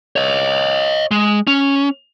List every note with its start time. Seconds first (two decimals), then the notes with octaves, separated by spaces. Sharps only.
0.16 C#5 D#5
1.11 G#3
1.47 C#4